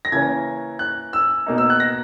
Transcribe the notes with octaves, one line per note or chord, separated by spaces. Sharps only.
A#6
C#3 E3 A#3 C#4 G#6
F#6
E6
B2 A#3 D#4
E6
F#6
A#6